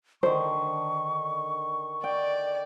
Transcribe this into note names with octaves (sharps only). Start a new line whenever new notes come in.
D3 D#3 C5 C#6
D5 G5